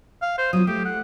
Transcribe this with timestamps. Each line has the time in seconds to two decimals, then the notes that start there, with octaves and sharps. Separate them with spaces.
0.22 F5
0.38 C5
0.53 F#3 B3 F4 D#6
0.67 A3 G4
0.85 F#5